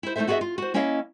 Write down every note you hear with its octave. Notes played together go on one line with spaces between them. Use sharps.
E4 C5
A3 D#4 E4 A4 C5 E5
B3 F#4 G#4 C#5 D#5 E5
F4
F#4 C5
A#3 C#4 E4 C#5 D#5 F5